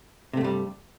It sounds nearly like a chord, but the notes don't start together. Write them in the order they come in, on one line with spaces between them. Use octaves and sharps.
C3 A3 G2 G3